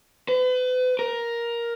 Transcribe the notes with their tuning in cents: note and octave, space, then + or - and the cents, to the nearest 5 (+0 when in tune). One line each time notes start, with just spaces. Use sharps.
B4 +40
A#4 +10